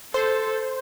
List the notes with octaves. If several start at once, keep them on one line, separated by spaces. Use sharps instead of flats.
A4 C5